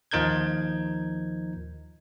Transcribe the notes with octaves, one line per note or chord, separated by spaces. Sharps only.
D#2 F3 D#4 A#4 G6 G#6